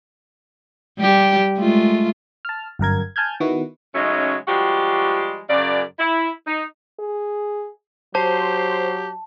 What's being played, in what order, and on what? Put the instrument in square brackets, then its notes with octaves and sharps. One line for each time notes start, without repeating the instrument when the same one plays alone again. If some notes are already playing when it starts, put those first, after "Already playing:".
[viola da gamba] G3 G4
G#3 A3 F4
[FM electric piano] A5 F6
G1 F#2 A#4 G#6
G#5 A5 F6 G6 G#6
D#3 B3 E4 F#4
[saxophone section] C#3 F#3 G#3 A3 C#4 D#4
F3 G3 G#3 F#4 G4
F#2 C#3 D5
E4
D#4
[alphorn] G#4
[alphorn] F#3 [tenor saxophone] G4 [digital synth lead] C5 [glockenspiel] A5